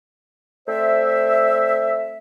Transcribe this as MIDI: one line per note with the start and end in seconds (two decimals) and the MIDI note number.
0.68 2.18 57
0.68 2.18 60
0.68 2.18 72
0.68 2.18 74
0.68 2.18 76